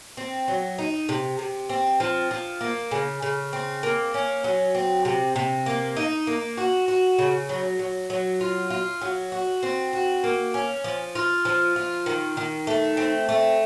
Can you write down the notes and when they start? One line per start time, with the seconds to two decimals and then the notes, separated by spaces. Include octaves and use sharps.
0.17 C4
0.48 F#3
0.78 D#4
1.09 C3
1.39 C3
1.69 C4
2.00 F3
2.31 F3
2.61 A#3
2.91 C#3
3.22 C#3
3.53 C4
3.83 A#3
4.14 C#4
4.44 F#3
4.75 C4
5.05 C3
5.36 C3
5.66 A#3
5.96 D#4
6.27 A#3
6.57 F#4
6.88 F#4
7.18 C#3
7.49 F#3
7.79 F#3
8.10 F#3
8.41 F4
8.70 F4
9.01 F#3
9.32 F#4
9.63 C4
9.93 F#4
10.24 A#3
10.54 C#4
10.84 F3
11.15 F4
11.45 F3
11.76 F4
12.06 D#3
12.37 D#3
12.67 A3
12.97 C4
13.29 A3